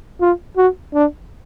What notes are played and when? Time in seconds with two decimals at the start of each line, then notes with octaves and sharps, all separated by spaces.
0.21 F4
0.57 F#4
0.94 D4